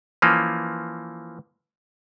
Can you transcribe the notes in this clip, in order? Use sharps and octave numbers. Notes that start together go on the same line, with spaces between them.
E3 F3 A#3 C#4